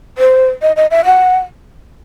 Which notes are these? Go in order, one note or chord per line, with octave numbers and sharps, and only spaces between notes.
C5
D#5
D#5
E5
F#5